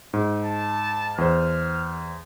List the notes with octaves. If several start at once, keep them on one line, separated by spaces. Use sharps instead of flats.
G#2
A5
E2 C5 F6